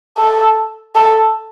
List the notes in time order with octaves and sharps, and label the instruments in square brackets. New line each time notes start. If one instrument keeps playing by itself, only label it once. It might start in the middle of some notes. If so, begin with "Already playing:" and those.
[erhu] A4
A4